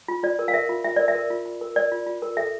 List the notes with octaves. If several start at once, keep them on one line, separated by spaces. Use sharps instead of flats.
F4
F4 D5
A#4
F5
A#4 E5
F4
F4 E5
A#4 D5
E5
A#4
F4
F4
A#4
A#4 D5
F4
F4
A#4
A4 E5